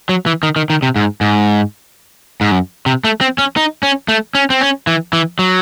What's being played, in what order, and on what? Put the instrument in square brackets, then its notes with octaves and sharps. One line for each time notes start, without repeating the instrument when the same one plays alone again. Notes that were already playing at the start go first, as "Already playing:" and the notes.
[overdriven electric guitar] F#3
E3
D#3
D#3
D#3
C3
G#2
G#2
G#2
F#2
C3
A3
C4
C#4
D#4
C#4
A3
C#4
C4
C#4
E3
E3
F#3